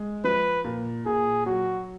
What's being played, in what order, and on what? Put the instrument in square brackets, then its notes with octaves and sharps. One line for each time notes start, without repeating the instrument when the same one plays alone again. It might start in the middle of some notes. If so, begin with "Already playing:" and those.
Already playing: [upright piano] G#3
[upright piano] F3 [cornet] B4
[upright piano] A#2
[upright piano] A#2 [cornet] G#4
[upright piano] F#3 [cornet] F#4